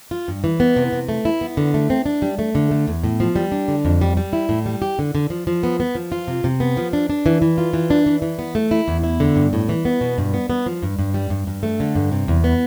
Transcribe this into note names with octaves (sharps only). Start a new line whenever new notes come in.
F4
G2
E3
B3
C3
C3
A3
E4
B3
D3
A3
C4
D4
G3
A3
D3
A3
E2
A2
F3
G3
D4
D3
F2
G3
G3
E4
A2
G3
G4
D3
D3
F3
F3
B3
B3
F3
F4
C3
C3
B3
F3
D4
D4
E3
E3
F4
E3
D4
E3
E3
B3
A3
E4
E2
E4
D3
G2
A2
E3
B3
B2
G2
B3
B3
F3
G2
G2
G3
G2
G2
A3
D3
G2
C3
E2
B3